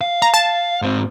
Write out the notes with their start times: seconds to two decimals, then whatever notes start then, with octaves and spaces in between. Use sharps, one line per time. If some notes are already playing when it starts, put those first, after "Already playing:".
0.01 F5
0.22 F5 A#5
0.34 A5
0.82 G#2 C4